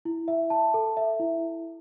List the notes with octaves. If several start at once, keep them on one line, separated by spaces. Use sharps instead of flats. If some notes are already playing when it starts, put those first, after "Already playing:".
E4
E5
A5
A4
E5
E4